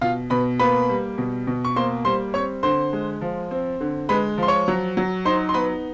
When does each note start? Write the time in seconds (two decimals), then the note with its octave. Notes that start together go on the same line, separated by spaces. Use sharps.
0.01 B2 F4 F5
0.30 B2 B4 B5
0.59 A#3 B4 B5
0.89 G3
1.18 B2
1.47 B2
1.65 C#6
1.76 A#3 C5 C6
2.05 G3 C5 C6
2.34 C4 C#5 C#6
2.63 D3 C5 C6
2.93 G#3
3.21 F3
3.51 C4
3.81 D3
4.09 G#3 B4 B5
4.38 F3 C6
4.48 C#5 C#6
4.68 F#3
4.97 F#3
5.25 D#4 C5 C6
5.49 C6
5.54 B3 B4 B5